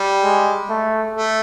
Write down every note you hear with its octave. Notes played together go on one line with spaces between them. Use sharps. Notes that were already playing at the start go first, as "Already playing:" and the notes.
Already playing: G3
G#3
A3
A3